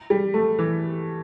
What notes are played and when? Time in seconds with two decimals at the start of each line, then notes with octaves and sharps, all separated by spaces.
0.10 G3
0.34 A3
0.59 E3